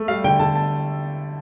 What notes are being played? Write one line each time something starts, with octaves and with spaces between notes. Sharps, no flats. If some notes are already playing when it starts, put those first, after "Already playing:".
Already playing: A3
G3 F5
D3 G5
D3 A5
A5